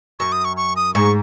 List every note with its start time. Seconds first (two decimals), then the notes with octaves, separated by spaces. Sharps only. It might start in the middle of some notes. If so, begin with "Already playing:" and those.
0.19 F#2 C#6
0.32 D#6
0.44 C#6
0.57 C#6
0.76 D#6
0.94 G#2 C#6